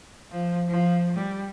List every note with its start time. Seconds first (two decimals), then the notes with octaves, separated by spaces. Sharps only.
0.32 F3
0.69 F3
1.16 G3